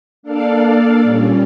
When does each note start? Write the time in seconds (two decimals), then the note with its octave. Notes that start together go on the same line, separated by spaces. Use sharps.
0.23 A#3 D4 A4 D5 F5
1.03 A#2 G3 C#4